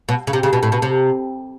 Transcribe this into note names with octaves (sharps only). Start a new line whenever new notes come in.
B2
C#3
C3
C#3
B2
A2
B2
C3